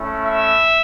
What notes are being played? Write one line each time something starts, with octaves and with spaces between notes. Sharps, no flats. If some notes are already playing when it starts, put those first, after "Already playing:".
Already playing: A3 C#4 E4
E5